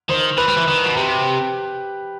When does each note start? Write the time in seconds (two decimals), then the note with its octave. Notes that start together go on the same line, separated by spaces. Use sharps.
0.09 D#3 C5
0.38 E3 B4
0.48 G3
0.57 E3
0.68 D#3
0.84 B2
0.96 C3 G4